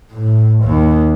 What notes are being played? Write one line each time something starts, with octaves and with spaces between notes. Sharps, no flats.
A2
D#2